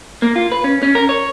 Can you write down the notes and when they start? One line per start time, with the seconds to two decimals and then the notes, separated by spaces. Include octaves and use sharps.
0.22 A#3
0.36 F4
0.52 B4
0.64 C#4
0.83 C#4
0.95 A#4
1.09 C#5